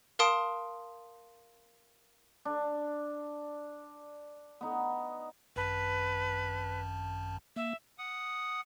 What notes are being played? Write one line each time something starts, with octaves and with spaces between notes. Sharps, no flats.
A#4 F5 A5 C6 D#6 D7
D4
B3 D#4
G#1 F#2 B4 A5
A#3 E5
F#5 D#6